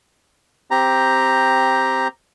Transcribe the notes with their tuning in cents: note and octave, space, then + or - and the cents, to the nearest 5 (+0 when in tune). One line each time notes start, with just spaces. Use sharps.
C4 +0 G4 +0 A#5 +0